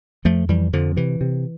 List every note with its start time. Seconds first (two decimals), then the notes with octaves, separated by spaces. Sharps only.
0.25 F2 F3 A3
0.49 F2 E3 G3
0.73 F2 D3 F3
0.97 C3 E3
1.21 C3